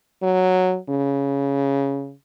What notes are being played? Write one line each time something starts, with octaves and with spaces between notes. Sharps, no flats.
F#3
C#3